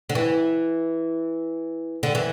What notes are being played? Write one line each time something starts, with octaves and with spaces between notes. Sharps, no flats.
D3
E3
D3
E3